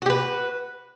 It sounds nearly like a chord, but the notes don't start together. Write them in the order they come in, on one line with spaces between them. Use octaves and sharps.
F#4 G4 B4